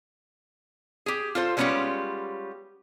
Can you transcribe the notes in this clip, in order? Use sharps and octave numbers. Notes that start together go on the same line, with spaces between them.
G4 G#4
F4 A4 C5
G3 G#3 B3 C#4 F4 G4